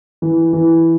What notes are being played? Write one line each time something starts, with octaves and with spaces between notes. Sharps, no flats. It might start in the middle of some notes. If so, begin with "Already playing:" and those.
E3
E3